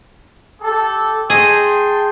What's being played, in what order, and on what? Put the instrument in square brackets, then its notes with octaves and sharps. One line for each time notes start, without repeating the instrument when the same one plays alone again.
[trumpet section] G4 A4
[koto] G#4 D#5 [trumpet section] G5 A5 C6